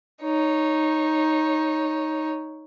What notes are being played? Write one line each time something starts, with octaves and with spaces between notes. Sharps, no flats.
D#4 C#5